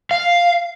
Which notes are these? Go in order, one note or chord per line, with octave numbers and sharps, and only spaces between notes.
F5